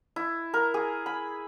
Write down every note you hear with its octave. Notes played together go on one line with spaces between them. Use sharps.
E4
A#4
G#4
B5